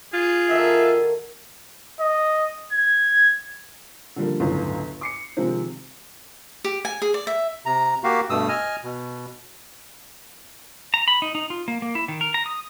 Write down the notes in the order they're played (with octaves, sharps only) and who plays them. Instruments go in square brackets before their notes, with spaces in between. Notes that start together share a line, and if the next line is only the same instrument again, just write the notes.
[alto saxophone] F4 [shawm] G#4
[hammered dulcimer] D#3 F#4 A4 [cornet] E5
[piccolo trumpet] D#5
G#6
[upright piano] D3 F3 G3 A#3
G1 C#2 F#2 A2 C#3
D6 C7 C#7
C3 D#3 F3 G#3 C4
[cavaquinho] G4
G#5
G#4
D5
E5
[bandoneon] C3 A#5
A#3 F#4 G4 F5
G2 B2 A3 D#6 E6
D#5 G#5 F6
B2
[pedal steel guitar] A#5
B5
D#4
D#4
F4
A#3
A#3
E4
D#3
A#4
A#5
D#6